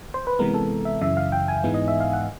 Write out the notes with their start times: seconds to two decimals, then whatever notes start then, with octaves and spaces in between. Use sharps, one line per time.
0.14 C5
0.27 B4
0.39 C3 E3 G#3 B3 A#4
0.54 A4
0.85 E5
1.01 F#2 C#3 E3 E5
1.17 F5
1.32 G5
1.48 G#5
1.64 G#2 E3 G#3 B3 D#4
1.74 D#5
1.88 E5
2.00 F5
2.13 F#5